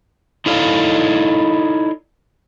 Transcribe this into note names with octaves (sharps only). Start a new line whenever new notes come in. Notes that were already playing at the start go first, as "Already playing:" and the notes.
D#4 E4 A4 C#5 D5 F5